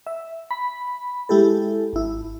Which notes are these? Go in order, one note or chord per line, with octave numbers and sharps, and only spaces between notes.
E5
B5
G#3 E4 G4 A4
G#1 E4